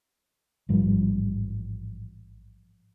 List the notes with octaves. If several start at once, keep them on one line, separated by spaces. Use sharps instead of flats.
A1 G#2 F3 G3